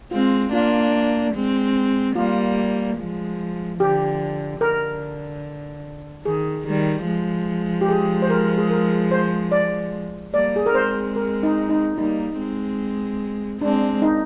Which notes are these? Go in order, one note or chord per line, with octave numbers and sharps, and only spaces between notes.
G#3 C4 F4
A#3 D4 F4
G#3 C4
G3 A#3 F4
F3 G#3
D3 F3 G4
D3 A#4
D#3 G#4
D#3 G3
F3 G#3
G4
G#4
C5
A#4
G#4
A#4
C5
D5
G3 A#3 D5
G#4
A#4
G#3 C4 C5
A#4
D#4
D#4
G3 A#3 D#4
G#3 C4
G#3 C4 D4
D#4